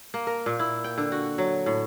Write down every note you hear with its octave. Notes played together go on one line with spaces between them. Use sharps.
A#3
A#4
A#2
E4
G5
D3
F#4
F#3
A2